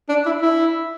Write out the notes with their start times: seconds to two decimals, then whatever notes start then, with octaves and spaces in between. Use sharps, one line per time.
0.09 D4
0.26 E4
0.42 E4